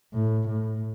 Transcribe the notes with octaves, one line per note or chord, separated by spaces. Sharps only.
A2
A2